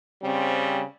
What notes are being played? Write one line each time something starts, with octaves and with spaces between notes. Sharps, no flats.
C#3 G3 C4